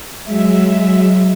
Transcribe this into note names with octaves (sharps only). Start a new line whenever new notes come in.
F#3 G#3 E5